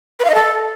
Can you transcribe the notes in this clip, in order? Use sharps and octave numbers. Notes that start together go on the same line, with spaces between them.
B4
F5
D#5
A4